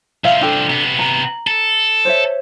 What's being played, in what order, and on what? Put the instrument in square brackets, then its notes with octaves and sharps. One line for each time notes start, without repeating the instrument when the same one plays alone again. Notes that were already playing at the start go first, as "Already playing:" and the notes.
[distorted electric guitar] C2 F3 [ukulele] E5 F5
[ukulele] D4 A4 G5
[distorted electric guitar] C3 B3
[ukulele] A#5
[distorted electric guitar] A4
[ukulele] C5 C#5 E5